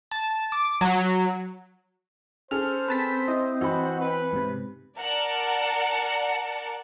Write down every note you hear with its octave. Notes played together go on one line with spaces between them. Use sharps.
A5
D6
F#3
C#4 G#4 A4 C5 F6
C4 B4 A5 B6
E4 D#5
E3 F#4 B5
B4
G#2 C3
A#4 D5 F#5 A5